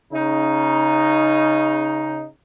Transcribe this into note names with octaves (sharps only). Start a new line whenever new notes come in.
C#3 D#4